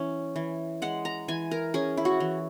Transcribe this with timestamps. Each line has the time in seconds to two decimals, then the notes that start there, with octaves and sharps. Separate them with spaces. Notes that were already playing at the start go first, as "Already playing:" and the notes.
Already playing: E3 C#4
0.36 E3
0.82 G#3 F#5
1.05 A#5
1.28 E3 G#5
1.51 A#4
1.74 C#4 G#4
1.97 E4
2.05 F#4
2.20 E3